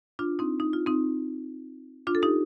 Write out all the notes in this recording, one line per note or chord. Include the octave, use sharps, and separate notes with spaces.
D4 F4
C4 D#4
D#4
F4
C4 D#4
D4 F4
A4
D#4 G4